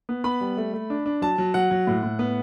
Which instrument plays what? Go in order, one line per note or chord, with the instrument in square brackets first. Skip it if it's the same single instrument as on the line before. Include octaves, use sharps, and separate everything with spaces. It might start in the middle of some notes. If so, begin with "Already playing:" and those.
[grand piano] B3
B3 B5
G3
A3
A3
D4
D4
F#3 A5
F#3
F#3 F#5
F#3
A2
A2
B3